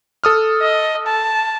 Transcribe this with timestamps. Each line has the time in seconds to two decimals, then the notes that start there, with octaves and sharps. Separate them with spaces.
0.24 A4 D#6 F6
0.62 D#5
1.07 A5